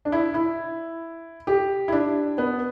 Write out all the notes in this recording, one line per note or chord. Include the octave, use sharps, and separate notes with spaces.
D4
E4
E4
G4
E4
D4
B3